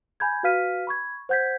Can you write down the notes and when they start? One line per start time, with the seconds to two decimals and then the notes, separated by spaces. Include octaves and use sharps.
0.20 G#5 B5 G6 G#6
0.43 F#4 B4 F5 F6 B6 D#7
0.87 B5 C#6 G#6
1.29 C5 F#5 G6 G#6 B6